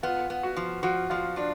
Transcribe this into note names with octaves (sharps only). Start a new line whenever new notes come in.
B3 F4
B3
F#4
F3
F3 F#4
F3 F4
D4 F4